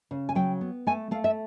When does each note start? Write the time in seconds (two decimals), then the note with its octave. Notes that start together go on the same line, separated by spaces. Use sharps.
0.11 C#3
0.29 G#5
0.35 F#3 G5
0.61 B3
0.87 A3 G#5
1.11 A3 F5
1.24 E5